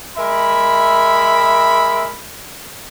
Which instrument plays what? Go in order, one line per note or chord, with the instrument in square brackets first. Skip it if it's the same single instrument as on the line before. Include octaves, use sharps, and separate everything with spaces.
[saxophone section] G#3 A#4 E5 [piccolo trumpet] B5